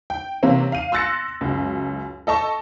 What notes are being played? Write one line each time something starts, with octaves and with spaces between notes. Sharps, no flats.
G5
C3 E3 A#3 C4 C#4
F5 D#7
C6 E6 F#6 A6 A#6 C#7
C#2 F#2
A4 D#5 A5 C#6